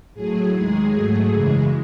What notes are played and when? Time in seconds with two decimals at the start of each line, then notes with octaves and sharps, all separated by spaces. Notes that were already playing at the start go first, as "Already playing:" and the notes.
0.14 A2 F#3 A3 G#4
0.53 D#2 D#3 G#3 G#4
0.92 G#2 F#3 A3
1.31 F#2 C#3 E3 G#3